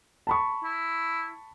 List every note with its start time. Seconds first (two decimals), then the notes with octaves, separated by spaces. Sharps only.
0.27 A5 B5 C#6
0.64 E4